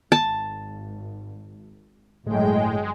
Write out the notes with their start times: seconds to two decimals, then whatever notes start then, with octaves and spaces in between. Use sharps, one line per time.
0.12 G#1 A5
2.27 G1 A2 F#3 G#3 G5